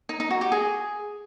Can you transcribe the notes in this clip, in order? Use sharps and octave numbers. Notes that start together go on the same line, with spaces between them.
D#4
D#4
F#4
G4
G#4